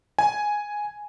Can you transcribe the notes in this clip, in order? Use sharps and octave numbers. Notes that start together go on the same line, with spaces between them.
G#5